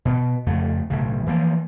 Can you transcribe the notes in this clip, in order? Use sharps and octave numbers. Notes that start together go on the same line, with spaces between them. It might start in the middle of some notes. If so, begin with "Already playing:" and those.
B2
F2 C#3 A3
B1 A2 C#3
E3 F3 A#3